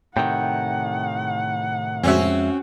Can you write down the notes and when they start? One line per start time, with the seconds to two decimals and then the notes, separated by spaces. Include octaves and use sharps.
0.17 A2 C3 D#3 F#5 G5
2.03 F2 G#3 C4 C#4 F#4 E5